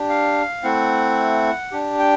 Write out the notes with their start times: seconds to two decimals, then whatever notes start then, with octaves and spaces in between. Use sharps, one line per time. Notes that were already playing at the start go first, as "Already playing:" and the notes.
Already playing: D4 G4
0.09 F5
0.63 A3 C4 E4 F#5
1.72 D4 G4
1.99 G5